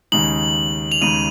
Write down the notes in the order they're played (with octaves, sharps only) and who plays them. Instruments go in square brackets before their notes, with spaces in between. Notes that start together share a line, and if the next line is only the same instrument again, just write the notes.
[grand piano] D#2 C#3 G#3 D#4 [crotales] F#7
[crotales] F7
[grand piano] D#2 C#3 G#3 D#4 [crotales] D#7